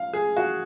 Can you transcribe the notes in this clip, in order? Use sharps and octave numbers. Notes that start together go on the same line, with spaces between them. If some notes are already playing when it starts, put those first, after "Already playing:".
Already playing: F5
G#4
F#4